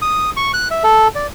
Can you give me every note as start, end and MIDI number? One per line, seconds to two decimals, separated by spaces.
0.02 0.30 87
0.37 0.52 85
0.54 0.68 90
0.71 0.83 76
0.83 1.08 69
1.15 1.27 74